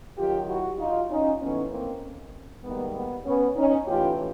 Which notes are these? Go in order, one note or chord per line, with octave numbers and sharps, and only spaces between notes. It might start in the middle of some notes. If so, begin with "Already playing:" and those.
F#2 D#3 F#3 F4 G4
E4 F#4
D#4 F4
C#4 D#4
A2 E3 A3 B3 C#4
A#3 C4
G#2 D#3 G3 A#3 B3
B3
B3 C#4
C#4 D#4
A2 E3 A3 F4 G4